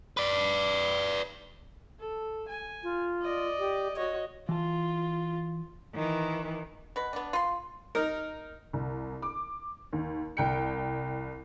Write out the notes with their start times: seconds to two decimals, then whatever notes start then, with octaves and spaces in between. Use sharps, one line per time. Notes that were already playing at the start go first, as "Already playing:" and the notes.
0.17 B4 D5
1.99 A4
2.48 G#5
2.83 F4
3.22 D5 D#5
3.59 G4
3.96 F#4 C#5 D#5
4.49 E3 F4 A5
5.95 D#3 E3
6.96 B2 B4
7.13 B3 D4
7.33 F4 C6
7.95 D#4 A#4
8.73 C2
9.22 D6
9.93 D#2
10.37 C2 G5 C#7